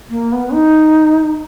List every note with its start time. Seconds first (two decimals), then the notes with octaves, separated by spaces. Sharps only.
0.10 A#3
0.32 B3
0.53 D#4